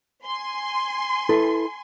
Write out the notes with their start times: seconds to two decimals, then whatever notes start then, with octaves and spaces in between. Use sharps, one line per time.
0.25 G#5 C6
1.29 E4 A4 B4